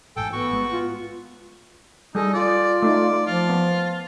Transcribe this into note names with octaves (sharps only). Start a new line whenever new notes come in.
A1 G#2 A4 G5 G#5
B3 F#4 C#6
G#3
F4
G3 D#4 G#4 A4
F4 D5
A3 D#4 D5
F3 F4
B3